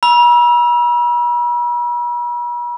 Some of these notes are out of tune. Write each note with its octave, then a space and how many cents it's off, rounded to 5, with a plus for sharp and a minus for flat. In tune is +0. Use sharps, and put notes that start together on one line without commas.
B5 -45 E6 +0